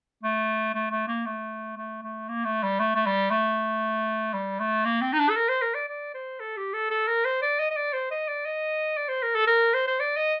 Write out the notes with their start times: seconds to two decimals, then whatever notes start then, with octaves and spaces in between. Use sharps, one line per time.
0.23 A3
0.74 A3
0.91 A3
1.08 A#3
1.26 A3
1.77 A3
2.03 A3
2.28 A#3
2.45 A3
2.63 G3
2.79 A3
2.95 A3
3.06 G3
3.30 A3
4.33 G3
4.59 A3
4.85 A#3
5.02 C4
5.13 D#4
5.19 D4
5.30 A4
5.36 A#4
5.49 C5
5.62 A#4
5.74 D5
5.88 D5
6.14 C5
6.40 A4
6.57 G4
6.74 A4
6.90 A4
7.07 A#4
7.25 C5
7.42 D5
7.59 D#5
7.71 D#5
7.76 D5
7.93 C5
8.11 D#5
8.28 D5
8.45 D#5
8.97 D5
9.09 C5
9.22 A#4
9.35 A4
9.47 A#4
9.74 C5
9.87 C5
10.00 D5
10.17 D#5